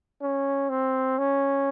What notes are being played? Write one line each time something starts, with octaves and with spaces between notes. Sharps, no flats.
C#4
C4
C#4